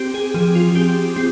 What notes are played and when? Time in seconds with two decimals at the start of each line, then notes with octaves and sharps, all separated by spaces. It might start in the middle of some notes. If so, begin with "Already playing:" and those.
Already playing: C4 G4
0.14 G#4
0.34 F3 G#4
0.55 F4
0.75 C4 G4
1.16 C4